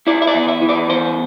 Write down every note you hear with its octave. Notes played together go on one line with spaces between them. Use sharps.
E4 D5
E5
D5
E2
E5
E3
D5
E2 C5